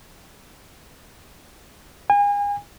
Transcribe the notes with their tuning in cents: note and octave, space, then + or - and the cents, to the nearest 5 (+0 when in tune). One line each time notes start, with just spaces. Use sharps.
G#5 -35